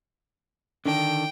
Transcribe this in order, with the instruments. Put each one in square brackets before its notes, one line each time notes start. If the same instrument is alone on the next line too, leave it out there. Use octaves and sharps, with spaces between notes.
[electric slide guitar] D3 D#3 D4 [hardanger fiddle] G5